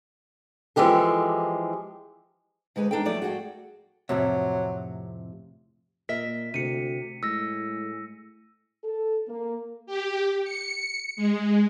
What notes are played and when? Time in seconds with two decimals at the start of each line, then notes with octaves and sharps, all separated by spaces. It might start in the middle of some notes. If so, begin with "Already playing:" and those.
0.76 E3 F3 G#3 G4 A4
2.76 D2 G#3 B4 G#5
2.91 E2 D3 D4 D#4 A4 G5
3.05 F3 F#3 A3 D5
3.22 F#4 G#4 A4 F#5 G5
4.09 F2 A2 C3 F#3
6.09 A#2 A#4 D#5 E5 B6
6.54 D2 C3 C#7 D#7
7.23 A2 G#3 E6 A#6
8.84 A4
9.28 A#3
9.87 G4
10.44 C#7
11.16 G#3